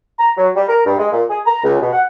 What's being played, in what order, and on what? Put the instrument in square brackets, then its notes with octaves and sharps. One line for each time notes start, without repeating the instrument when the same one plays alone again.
[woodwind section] A#5
F#3
G3
A#4
G2
G#3
A#2
G#4
A#5
C#2
B2
F#5